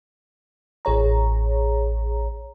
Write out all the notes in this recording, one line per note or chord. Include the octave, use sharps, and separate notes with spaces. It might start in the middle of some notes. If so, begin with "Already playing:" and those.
A1 G#4 C#5 A#5